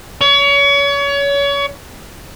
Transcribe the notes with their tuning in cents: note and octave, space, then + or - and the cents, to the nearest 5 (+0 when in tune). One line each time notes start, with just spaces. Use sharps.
C#5 +30